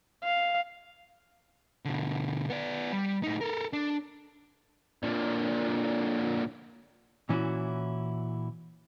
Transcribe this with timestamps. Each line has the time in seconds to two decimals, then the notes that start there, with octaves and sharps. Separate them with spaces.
0.24 F5
1.85 B2 D3
2.50 B3 D5
2.92 G3
3.23 A2 D#4
3.41 A4 A#4
3.73 D4
5.03 A#2 D3
7.29 A#2 E3 C#4 D4 E4 F#4